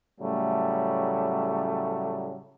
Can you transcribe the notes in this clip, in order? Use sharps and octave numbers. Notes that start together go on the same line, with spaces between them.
A2 C#3 F#3 G3 A3